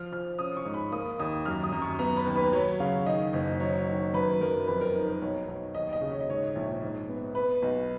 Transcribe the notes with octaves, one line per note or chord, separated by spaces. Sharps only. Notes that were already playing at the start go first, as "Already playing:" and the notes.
Already playing: F3 F6
F3 F6
C#4 D#6
C#6
G#2
B5
A#3 D#6
D#2 D#6
F#2 F6
D#6
F#2
C#6
B3 A#5
B4
D#2
B4
F#3 C#5
C#3 F5
D#3 D#5
F#1
F#3 C#5
D#3
F#2 B4
F#2 A#4
F2 B4
A#4
D#4
A#4
B1 C#5
B1
D#2 D#5
D#5
C#3
C#5
D#5
G#2 C#5
A#1
G#2
B3
B3 B4
B1